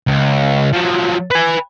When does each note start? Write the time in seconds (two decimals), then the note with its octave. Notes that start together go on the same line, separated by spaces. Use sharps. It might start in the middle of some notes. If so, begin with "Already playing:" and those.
0.07 C#2
0.73 F3 F#3
1.31 B4 G#5